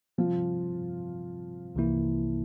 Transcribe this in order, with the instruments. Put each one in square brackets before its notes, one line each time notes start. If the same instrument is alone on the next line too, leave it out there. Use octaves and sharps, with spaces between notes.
[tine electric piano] C3 G3 C4 [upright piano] F3 F4
[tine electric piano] C2 C3 E3 A#3 E4